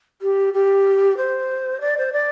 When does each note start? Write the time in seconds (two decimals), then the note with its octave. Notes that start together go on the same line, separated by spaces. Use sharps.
0.22 G4
0.54 G4
1.17 C5
1.81 D5
1.98 C5
2.13 D5